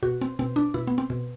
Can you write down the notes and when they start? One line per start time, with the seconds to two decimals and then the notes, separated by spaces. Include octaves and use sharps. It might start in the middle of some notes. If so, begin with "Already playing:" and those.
0.03 B2 F#4
0.21 C4
0.39 B2 C4
0.56 D4
0.74 B2 E4
0.87 B3
0.98 C4
1.10 B2